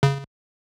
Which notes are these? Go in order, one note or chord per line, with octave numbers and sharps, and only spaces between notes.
C#3